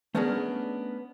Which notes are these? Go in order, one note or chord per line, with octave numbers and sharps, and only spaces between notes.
A3 B3 C#4 D4 G#4 A#4